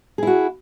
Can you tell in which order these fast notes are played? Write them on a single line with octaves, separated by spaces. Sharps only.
G#4 E4 F#4